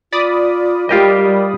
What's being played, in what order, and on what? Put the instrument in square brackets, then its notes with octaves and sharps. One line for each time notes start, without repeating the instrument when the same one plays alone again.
[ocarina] F4 [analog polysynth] D5 B5 D#6
[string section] G3 [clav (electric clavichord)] F4 G4 D#5 [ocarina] A#4